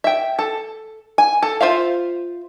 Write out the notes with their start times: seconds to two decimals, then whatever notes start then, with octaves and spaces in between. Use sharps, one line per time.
0.04 E5 G5
0.39 A4
1.18 G#5
1.42 A4
1.61 F4 C5 E5 F5